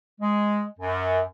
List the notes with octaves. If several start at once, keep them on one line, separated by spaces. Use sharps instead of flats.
G#3
F#2